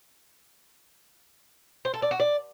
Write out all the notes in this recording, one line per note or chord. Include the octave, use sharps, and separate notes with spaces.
C5
A4
D5
F#4
D5